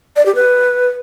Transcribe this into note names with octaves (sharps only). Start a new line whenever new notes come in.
D5
G4
B4